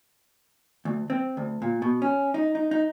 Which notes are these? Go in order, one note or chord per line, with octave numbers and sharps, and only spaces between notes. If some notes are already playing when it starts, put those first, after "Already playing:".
D2
C4
D2
A#2
B2
C#4
D#4
D#4
D#4